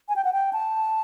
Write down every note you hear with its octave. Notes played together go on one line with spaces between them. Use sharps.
G#5
G5
F#5
G5
A5